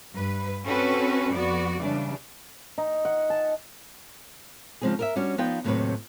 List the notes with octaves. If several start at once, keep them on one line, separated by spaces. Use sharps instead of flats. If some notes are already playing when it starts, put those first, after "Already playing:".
G2 B4
C4 C#4 F#4 A4 B4
F2 B3 F#4 D5
C#3 E3 G3 D4
D#4
F#5
A5
C#3 F3 G#3 C4 D#4 G#4
A#4 D#5 E5
G3 C#4 D4 F#4
F3 B3 D#4 F4 D5 G5
D#2 A2 C3 F#3 C4 B4